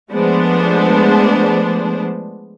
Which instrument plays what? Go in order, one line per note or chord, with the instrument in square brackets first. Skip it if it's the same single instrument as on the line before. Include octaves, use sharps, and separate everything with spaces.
[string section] F3 G#3 A3 B3 D4 C5